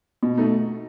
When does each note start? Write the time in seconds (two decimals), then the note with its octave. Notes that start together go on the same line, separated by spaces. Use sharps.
0.23 B2
0.38 A3 D#4